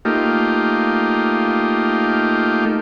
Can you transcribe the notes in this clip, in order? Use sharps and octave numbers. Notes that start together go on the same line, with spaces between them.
A3 A#3 D#4 F4 G4